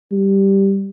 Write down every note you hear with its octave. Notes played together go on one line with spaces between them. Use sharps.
G3